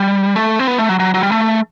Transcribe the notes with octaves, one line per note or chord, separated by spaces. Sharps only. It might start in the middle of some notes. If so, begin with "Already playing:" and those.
Already playing: G3
A3
C4
B3
A3
F#3
F#3
F#3
G3
A3